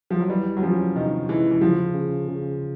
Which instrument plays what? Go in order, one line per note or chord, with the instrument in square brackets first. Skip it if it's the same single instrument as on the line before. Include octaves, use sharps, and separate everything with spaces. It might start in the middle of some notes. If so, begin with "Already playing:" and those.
[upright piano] F3
F#3
[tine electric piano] E3 [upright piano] G3
[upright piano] F#3
[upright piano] F3 [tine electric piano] C#4
[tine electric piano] C3 [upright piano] D#3
[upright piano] E3 [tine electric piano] G#3
[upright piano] E3
[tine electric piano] C#3 [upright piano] F3
[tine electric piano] C#3
C#3